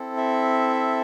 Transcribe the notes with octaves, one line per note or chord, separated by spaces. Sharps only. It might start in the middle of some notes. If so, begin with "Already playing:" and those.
Already playing: C4 E4 A4
E5